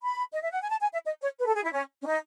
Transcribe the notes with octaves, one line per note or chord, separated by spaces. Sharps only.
B5
D#5
E5
F#5
G#5
A5
G#5
E5
D#5
C#5
B4
A4
G#4
E4
C#4
C#4
D#4